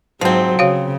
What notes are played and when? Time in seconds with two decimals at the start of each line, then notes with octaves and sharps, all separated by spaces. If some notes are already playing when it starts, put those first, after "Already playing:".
0.21 G#2 F3 F#3 C4
0.59 C#3 F#4 C#5 F5